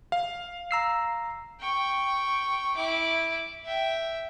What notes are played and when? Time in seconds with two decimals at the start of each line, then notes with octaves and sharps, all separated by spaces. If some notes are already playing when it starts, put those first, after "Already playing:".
0.12 F5
0.71 A#5 E6 C7
1.60 G5 C#6
2.75 E4 D6
3.64 E5 G5